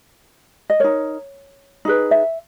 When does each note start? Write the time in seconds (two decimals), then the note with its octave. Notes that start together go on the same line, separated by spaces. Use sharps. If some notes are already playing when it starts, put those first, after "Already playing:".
0.70 D#5
0.80 D#4 A#4 C#5
1.85 D#4 G#4 B4
2.11 E5